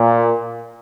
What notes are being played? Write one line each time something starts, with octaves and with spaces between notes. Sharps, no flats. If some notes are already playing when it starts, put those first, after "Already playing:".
Already playing: A#2